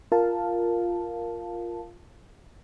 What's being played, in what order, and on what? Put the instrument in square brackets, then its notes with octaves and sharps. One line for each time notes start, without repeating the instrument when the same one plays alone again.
[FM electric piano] F4 A#4 F5 A5